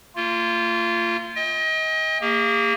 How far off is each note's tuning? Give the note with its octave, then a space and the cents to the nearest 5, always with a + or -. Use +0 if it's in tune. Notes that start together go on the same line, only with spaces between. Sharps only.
A#3 -40 F4 -15
D#5 +30 G5 +45
A#3 -20 G#4 -45